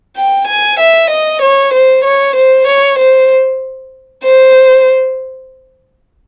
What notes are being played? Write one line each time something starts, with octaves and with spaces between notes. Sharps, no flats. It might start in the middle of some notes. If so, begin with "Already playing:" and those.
G5
G#5
E5
D#5
C#5
C5
C#5
C5
C#5
C5
C5